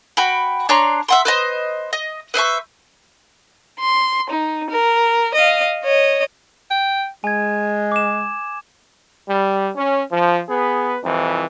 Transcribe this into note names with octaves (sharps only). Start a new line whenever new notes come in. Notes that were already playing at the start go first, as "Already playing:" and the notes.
F#4 G5 B5
D4 C#5 A#5 C6
E5 F#5 C6
B4 C5 D#5
D#5
B4 C5 E5 C#6
C6
D#4
A#4
D#5 F5
C#5 D#5
G5
G#3 G#5 G#6
D6 E7
G3
C#4
F3
B3 G#4 B4
C2 F2 E3